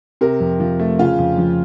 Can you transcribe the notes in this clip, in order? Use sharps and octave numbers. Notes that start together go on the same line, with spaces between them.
C3 A#4
F2
F3
A3
C#3 F4 F5
F2
F3